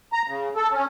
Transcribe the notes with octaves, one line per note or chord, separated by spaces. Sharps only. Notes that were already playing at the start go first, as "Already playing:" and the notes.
A#5
C#3
A4
C#4